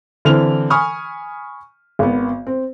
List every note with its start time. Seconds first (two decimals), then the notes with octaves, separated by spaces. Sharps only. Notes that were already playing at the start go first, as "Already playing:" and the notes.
0.25 D3 E3 C4 F6 F7
0.70 G#5 B5 C#6 D#6 F6
1.99 G#1 B3
2.47 C4